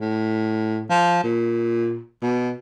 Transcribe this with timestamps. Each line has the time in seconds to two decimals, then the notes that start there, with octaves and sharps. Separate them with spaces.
0.01 A2
0.90 F3
1.24 A#2
2.22 B2